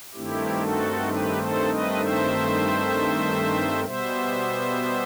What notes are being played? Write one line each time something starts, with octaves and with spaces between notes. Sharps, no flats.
G2 D#3 A3 C4 E4 G4
F#4 A4
G4 B4
A4 C5
B4 D#5
C5 E5
B2 G3 B3 C5 E5